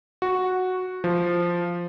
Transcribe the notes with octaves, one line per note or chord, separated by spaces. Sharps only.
F#4
F3